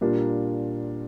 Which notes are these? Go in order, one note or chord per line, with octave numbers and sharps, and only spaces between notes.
A#2 G3 A#3 D4 F4